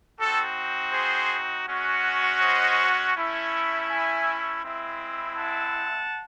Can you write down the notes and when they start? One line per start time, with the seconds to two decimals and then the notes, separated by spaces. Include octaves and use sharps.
0.19 C4 D#4 F#4 A4
0.93 G#4 C5
1.67 G#3 C#4 F#4
2.41 C5 D#5
3.15 A3 C#4 E4
3.88 E5 G#5
4.62 G#3 C4 E4
5.36 F#5 A5